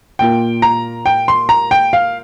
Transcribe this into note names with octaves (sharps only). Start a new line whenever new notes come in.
A#2 A#3 F4 G5
A#5
G5
C6
A#5
G5
F5